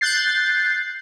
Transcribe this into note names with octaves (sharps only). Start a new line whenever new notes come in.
F#6 G6 A6 C7